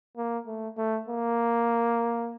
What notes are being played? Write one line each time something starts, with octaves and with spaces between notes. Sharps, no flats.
A#3
A3
A3
A#3